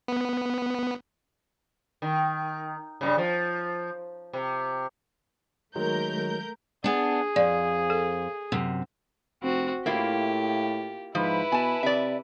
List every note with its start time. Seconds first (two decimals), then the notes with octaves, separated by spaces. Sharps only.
0.08 B3
2.02 D#3
3.01 G2 A#2 C#3
3.18 F3
4.33 C3
5.75 D#3 F#3 G#3 A3 A#4 G6
6.84 B3 D4 G#4
7.36 F2 D5
7.90 A4
8.52 F#2 C3
9.43 F1 C4 F#4
9.86 A2 A#3 E4 F4 G4
11.15 G#2 F3 E4 B4
11.52 B2 G#5 A5
11.83 C3 D5 E5